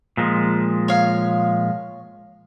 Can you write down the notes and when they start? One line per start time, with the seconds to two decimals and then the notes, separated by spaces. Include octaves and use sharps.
0.17 A#2 F3 G#3
0.88 C#5 F5